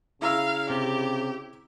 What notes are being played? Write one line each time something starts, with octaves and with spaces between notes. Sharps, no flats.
C#3 E4 F5 A#5 E6
C3 G4